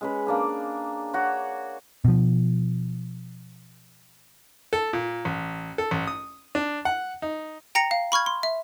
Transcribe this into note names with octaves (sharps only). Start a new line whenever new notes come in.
G#3 C#4 B4
A#3 D4 G#4
F#4 C#5
B2 F3
A4
A#2
A1
A4
A1
D#6
D4
F#5
D#4
G5 A#5 A#6 C#7 F7
F5
B5 C#6 F6 G#6
C6
E5